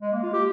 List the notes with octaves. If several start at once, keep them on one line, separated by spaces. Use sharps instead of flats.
G#3
A#3
F4
G4